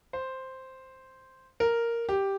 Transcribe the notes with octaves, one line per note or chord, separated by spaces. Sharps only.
C5
A#4
G4